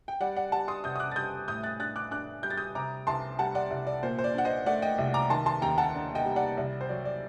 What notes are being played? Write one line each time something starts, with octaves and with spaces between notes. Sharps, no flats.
G5
G3 D5 F#5
D5 F#5
G3 F#5 A5
C6 D#6
C3 D#6 G6
D#6
D6 F#6
A6
G3 D#6 G6
A2 D#6 G6
F#6 A6
D4 F#6 A6
D6 F#6
D4 D6 F#6
G3 G6
A6
D#6 G6
C3 A#5 D6
C2 A5 C6
G3 F#5 A5
D5 F#5
C2
D5
A#2 C5
C5
D5
D4 F#5
C5 D#5
A3 D5 F#5
D#5 G5
C2
A#5 D6
D#3 A5 C6
A5 C6
D#2 G5 A#5
F#5 A5
D4
D#5 G5
G3
D5 F#5
C2 D5
C5
F#3 D5
D5